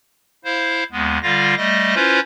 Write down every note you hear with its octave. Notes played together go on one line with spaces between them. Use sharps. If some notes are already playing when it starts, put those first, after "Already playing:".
E4 C5 F5
D#2 G#3 B3
D3 G3 F4 F5 A#6
G3 A3 D#5 A#6
C#4 E4 F4 B4 C5